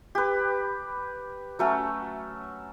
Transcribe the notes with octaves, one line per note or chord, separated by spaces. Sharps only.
G4 B4
F#3 A3 C#4